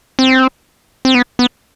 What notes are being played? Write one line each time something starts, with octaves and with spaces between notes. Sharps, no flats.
C4
C4
B3
B3